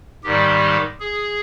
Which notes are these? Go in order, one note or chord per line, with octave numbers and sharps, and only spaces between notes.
G#2 D#3 G3 G4
G#4